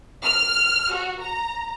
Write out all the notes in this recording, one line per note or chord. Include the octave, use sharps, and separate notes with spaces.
F6
F#4
A#5